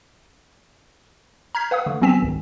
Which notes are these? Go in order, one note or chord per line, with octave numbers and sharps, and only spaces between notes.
A#5 F6 G6 G#6 B6
B4 F5 F#5 D#6
D3 A3
F#3 B3 C4 G#5 B6 E7
G#1 C#2